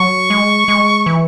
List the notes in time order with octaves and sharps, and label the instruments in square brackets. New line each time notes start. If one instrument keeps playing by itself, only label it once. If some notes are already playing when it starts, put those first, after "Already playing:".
Already playing: [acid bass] F#3 [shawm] C#6
[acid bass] G#3
G#3
E3